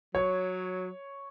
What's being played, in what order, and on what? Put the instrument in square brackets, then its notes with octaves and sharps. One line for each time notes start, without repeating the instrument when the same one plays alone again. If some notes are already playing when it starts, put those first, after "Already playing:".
[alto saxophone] F#3 [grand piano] C#5